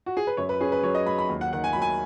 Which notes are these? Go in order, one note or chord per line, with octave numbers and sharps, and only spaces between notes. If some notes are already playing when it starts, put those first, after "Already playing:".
F#4
G#4
B4
F#2 C#5
B4
C#4 G#4
B4
F#3 C#5
D#5
F#3 B5
B5
D#2
F#5
D#3 F#5
G#5
F#3 B5
G#5